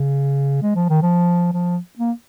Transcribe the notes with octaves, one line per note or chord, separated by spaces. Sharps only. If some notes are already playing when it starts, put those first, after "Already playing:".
Already playing: C#3
G#3
F3
D#3
F3
F3
A#3